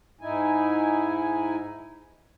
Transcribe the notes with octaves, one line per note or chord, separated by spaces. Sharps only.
G#2 D#4 E4 G#5